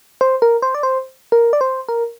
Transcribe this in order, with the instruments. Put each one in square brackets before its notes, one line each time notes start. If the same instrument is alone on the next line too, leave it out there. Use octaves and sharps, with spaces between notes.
[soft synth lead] C5
A#4
C5
D5
C5
A#4
D5
C5
A#4